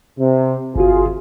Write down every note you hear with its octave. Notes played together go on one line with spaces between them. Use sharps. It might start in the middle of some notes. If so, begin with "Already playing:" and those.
C3
G1 F4 F#4 G#4